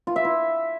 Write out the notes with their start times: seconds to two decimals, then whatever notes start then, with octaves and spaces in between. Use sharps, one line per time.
0.07 F4
0.16 E5
0.25 E4